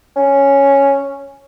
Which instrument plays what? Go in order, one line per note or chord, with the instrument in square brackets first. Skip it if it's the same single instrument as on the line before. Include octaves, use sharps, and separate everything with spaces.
[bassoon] C#4